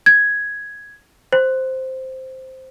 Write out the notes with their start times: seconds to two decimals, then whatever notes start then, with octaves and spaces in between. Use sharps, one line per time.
0.06 G#6
1.32 C5